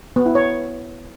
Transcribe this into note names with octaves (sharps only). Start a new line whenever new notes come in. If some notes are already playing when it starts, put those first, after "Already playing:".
B3
E4
C#5